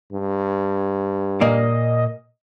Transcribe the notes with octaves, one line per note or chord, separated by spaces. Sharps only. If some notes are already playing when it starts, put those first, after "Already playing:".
G2
A#2 A#3 D5 D#5